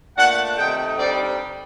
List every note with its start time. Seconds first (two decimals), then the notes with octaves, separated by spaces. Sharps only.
0.16 A#2 A3 D4 F#5
0.57 C3 D#3 A3 D#4 G5
0.98 G2 D3 G3 C4 D#4 D5